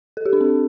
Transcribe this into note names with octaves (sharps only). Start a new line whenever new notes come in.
A4
G4
D4
C4